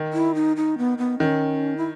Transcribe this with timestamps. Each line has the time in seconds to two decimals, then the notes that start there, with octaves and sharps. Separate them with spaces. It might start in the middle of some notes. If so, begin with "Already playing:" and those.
Already playing: D#3
0.13 E4
0.35 D#4
0.56 D#4
0.78 B3
0.98 B3
1.19 D#3 C#4
1.77 E4